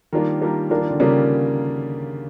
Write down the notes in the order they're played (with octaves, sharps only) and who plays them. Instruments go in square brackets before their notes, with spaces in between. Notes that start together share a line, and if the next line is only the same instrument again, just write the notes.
[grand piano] D#3 [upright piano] G3 A#3 D4 F4 A#4
[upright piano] G3 A#3 D4 F4 A#4
[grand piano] D#3 [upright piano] G3 A#3 D4 F4 A#4
[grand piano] D#3
D3
[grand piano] C#3 [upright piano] G3 A#3 D4 F4 A#4